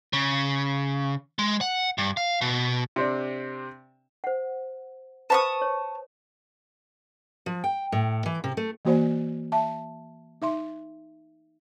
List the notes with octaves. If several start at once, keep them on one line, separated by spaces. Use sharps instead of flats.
C#3
G#3
F#5
G2
F5
B2
C3 C4 D4
C5 F#5
B4 C5 F5 A5 C#6 D#6
C#5
F3
G5
A2
E3
C3
A3
E3 A#3 F#4 C5 D5 G#5
E5 A5
D#4 E5 C6